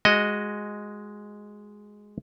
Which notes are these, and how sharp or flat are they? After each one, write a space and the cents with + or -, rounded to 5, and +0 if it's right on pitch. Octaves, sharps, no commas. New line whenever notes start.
G#3 +0 F#4 +0 D#5 +0